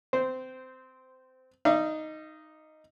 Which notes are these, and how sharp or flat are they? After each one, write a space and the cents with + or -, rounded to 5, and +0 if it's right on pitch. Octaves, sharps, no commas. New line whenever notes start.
C4 -20 C5 -10
D#4 +0 D5 +0 F5 -45